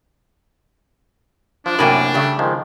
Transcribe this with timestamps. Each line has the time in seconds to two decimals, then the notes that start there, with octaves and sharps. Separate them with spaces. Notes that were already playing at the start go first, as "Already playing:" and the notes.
1.66 F3 D4
1.79 F#2 A2 C3 A#3 G5 G#5 B5
2.14 C#3 G3 A3 G4
2.39 D#3 F3 G#3